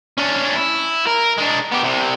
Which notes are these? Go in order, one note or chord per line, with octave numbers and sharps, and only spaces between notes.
C#4 D4
E4
A#4
G#3 D4
B3 G4
C2 C3